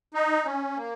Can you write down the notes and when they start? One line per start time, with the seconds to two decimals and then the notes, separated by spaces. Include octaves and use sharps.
0.14 D#4
0.45 C#4
0.77 A#3